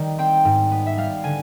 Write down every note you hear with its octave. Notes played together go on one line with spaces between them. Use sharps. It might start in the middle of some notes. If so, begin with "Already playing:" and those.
Already playing: D#3 G3
C4 G5
G#2
B3
E5
G3 F5
D3 G#5